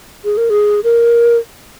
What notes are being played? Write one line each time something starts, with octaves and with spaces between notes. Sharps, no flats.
G#4
A#4
G#4
A#4